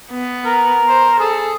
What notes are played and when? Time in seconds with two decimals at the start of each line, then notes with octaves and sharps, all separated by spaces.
0.11 B3
0.45 A#4
0.89 C5
1.19 G#4 A4